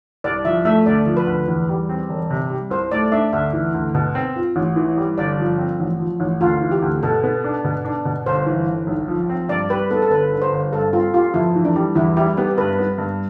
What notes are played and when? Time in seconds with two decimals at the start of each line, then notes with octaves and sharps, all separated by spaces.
0.24 C2 D5
0.45 F3 E5
0.65 A3 E5
0.86 D2 D5
1.06 F3
1.17 B4
1.26 D2
1.48 E2
1.69 G3
1.89 C4
2.09 E1
2.30 C3
2.50 G3
2.70 C2 C5
2.92 A3 D5
3.12 D4 E5
3.33 D2 E5
3.53 E3
3.74 D2
3.95 B2
4.15 C4
4.36 F4
4.56 A1
4.76 E3
4.97 G3
5.18 G1 D5
5.39 F3
5.58 C4
5.80 A1
5.99 F3
6.20 A1
6.41 D2 F4
6.61 E3
6.71 G4
6.82 D2
7.03 B2 A4
7.24 B3
7.44 D4
7.64 B2
7.85 D4
8.05 B2
8.26 G1 C5
8.46 E3
8.67 G1
8.87 B1
9.08 F3
9.29 C4
9.49 G2 D5
9.70 G3 B4
9.91 B3 A4
10.02 A4
10.10 G1 B4
10.32 D3
10.42 C5
10.52 G1
10.72 G2 A4
10.93 C4 F4
11.14 F4 G4
11.34 F2 E4
11.56 E3
11.65 D4
11.76 G3
11.95 E2 E4
12.17 G3 E4
12.37 B3 G4
12.58 G2 B4
12.79 B3
12.98 G2